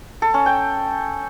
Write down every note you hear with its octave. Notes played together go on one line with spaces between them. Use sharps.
A4
C#4
G5